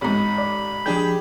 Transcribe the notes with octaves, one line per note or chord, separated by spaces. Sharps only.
A1 G#2 B5
D5
F3 D4 G4 G#4 G6